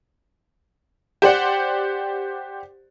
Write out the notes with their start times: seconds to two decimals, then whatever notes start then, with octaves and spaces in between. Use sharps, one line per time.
1.22 G4 C5 D5 F#5